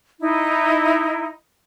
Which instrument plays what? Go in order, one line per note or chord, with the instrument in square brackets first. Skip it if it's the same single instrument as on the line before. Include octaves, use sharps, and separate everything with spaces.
[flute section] D#4 E4